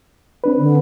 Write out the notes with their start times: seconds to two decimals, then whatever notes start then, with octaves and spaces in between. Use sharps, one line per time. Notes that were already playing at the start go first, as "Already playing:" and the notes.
0.44 C4 D4 B4
0.58 D3